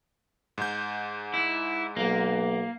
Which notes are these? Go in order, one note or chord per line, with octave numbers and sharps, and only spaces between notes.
G#2 G6
E4
B1 A#3